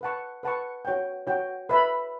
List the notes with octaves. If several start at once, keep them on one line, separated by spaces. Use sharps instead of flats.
B4 F#5 A5 C#6
B4 F#5 A5 C#6
F#4 C#5 G5
F#4 C#5 G5
B4 E5 B5